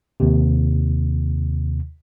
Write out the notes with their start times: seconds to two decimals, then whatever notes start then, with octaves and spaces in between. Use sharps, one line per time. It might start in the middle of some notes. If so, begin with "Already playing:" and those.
0.20 D#2 C3